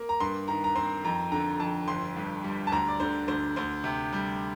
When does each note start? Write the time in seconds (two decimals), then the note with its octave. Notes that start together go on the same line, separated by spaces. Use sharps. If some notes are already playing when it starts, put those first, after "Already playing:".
Already playing: A#3
0.09 A#5
0.20 G2 C6
0.48 D#3 A#5
0.64 A#5
0.76 C4 C6
1.04 F2 A#5
1.32 D3 A#5
1.60 F2 A5
1.88 G1 C6
2.16 G2
2.44 G3
2.67 A5
2.72 D2 A#5
2.88 D5
3.00 D3 C5
3.28 D2 C5
3.56 D2 C5
3.84 C3
4.13 G3